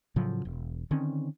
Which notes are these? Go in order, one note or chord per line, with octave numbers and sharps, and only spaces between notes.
A2 C#3 F3 F#3
E1
D3 D#3 C4 C#4